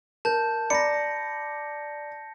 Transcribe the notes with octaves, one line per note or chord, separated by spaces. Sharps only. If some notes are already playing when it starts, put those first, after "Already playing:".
A#4 A5 G6
D5 A#5 B5 A#6 C#7